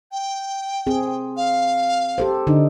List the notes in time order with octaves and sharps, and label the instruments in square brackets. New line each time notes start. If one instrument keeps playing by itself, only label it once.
[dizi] G5
[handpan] C4 G#4
[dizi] F5
[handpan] G4 A4 C5
D3 D4 D#4